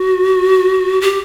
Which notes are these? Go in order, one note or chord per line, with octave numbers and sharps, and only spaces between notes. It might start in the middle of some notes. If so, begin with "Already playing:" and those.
Already playing: F#4
G4